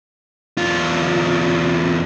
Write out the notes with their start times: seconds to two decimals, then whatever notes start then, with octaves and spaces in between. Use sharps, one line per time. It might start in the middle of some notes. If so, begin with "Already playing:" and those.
0.58 E2 F4